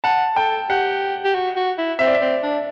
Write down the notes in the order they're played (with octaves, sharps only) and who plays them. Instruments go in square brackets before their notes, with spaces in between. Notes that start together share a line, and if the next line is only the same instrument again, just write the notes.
[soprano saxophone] F#5 [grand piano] A5
[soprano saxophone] A4 [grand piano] G5
[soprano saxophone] G4 [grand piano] F#5
[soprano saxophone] G4
F#4
F#4
E4
[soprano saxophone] C4 [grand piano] E5
[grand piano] D5
E5
[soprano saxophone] C4
D4